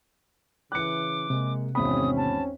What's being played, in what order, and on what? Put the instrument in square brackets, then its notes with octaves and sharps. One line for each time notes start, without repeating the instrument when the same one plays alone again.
[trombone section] C#3 E3 [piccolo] D6 [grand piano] F#6 C#7
[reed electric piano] C3 [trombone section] G#3 A#3
[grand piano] G#1 E2 B5 [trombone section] C4 C#4 [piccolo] D#6
[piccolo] A5